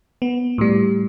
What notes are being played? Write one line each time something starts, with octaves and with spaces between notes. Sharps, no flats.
B3
A2 G3